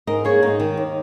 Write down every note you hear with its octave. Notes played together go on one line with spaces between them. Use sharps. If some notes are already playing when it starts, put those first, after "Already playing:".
G#2 A#4 D#5
A#3 G#4 C#5
G#2 D#4
D#3
D#2